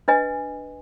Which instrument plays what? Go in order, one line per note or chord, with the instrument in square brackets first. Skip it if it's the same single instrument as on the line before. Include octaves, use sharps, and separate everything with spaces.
[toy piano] D4 B4 D#5 G#5